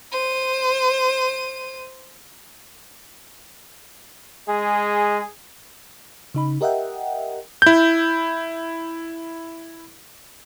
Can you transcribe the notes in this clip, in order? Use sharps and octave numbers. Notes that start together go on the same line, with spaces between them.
C5 D#7
G#3 G#4
C#3 D#4 B5
G4 A#4 D#5 E5 F#5 G5
E4 G6